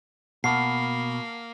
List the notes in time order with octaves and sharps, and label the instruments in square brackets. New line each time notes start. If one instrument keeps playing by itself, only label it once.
[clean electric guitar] B2 [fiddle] A#3 [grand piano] F#5 A5 F6 [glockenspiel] C7